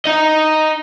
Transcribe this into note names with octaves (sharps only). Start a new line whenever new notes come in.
D#4 D#5